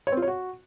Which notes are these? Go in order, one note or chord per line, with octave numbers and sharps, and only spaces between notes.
C#5
C4
F4
C#5
F#4